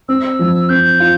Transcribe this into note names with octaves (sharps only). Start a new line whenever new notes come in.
C4 E6
F3
C4 G6
F4